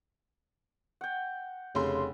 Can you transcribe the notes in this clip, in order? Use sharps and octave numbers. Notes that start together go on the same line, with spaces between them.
F#5 G5
F1 C#3 C6